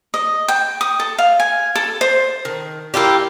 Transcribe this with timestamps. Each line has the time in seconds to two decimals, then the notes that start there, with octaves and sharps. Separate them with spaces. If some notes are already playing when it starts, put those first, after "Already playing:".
0.14 D#5
0.48 G5
0.81 D#6
1.00 A4
1.18 F5
1.40 G#5
1.76 A4
2.01 C5
2.45 D#3
2.94 A#3 E4 F4 G4